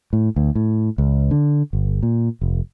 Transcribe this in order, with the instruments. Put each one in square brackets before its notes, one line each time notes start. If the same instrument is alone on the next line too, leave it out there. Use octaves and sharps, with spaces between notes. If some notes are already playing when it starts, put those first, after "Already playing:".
[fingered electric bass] A2
D2
A2
C#2
D3
G1
A#2
F1